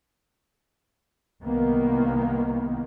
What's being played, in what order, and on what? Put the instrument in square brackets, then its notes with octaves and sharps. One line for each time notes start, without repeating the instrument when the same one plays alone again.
[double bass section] C2 D#3 A#3 B3